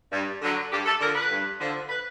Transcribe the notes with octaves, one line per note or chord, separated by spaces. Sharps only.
G2
D3 F#3
G2 G4
A4
D3 F3 A#4
B4
G2
D3 F3
B4